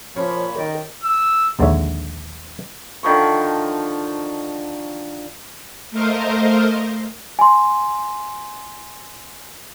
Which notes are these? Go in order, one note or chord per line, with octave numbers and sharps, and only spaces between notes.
A#2 C#3 F3 C#5 B5
D#3 G4 A#4 D5
E6
A#1 D#2 D3 G#3 C#5 E5
D3 D#3 F3 C#6
A3 A#4 C5 D#5 F5
G#5 C6